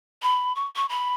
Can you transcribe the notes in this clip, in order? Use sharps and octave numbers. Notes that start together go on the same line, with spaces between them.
B5
C#6
C#6
B5